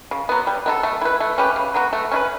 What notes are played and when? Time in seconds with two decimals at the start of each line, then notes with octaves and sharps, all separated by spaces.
0.11 C#3
0.29 F#3 B3
0.47 G3
0.66 B3 E4 A4
0.83 A3
1.01 E4 B4
1.20 A3
1.38 C#4 G4 B4
1.56 C#3
1.74 F#3 B3 F#4
1.93 A3
2.12 C#4 E4 B4